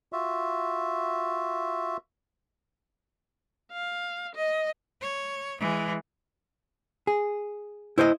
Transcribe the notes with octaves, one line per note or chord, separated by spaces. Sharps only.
F4 F#4 E5
F5
D#5
C#5
E3 G#3
G#4
E4 C5 C#5 D#5